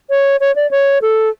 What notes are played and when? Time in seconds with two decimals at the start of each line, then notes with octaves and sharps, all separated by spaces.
0.10 C#5
0.40 C#5
0.56 D5
0.71 C#5
1.02 A4